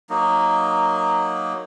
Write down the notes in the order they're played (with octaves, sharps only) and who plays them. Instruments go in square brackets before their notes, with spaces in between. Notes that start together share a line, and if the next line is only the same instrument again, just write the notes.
[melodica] F#3 A#3 D#4